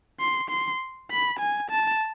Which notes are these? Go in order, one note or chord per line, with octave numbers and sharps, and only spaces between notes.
C6
C6
B5
G#5
A5